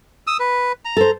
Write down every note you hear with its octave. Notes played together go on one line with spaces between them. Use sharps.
D#6 E6
B4
A#5
A4 C5